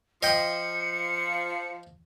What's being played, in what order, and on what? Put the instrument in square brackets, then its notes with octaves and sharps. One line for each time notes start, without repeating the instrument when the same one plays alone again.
[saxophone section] F3 [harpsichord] D#5 G5 [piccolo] C#7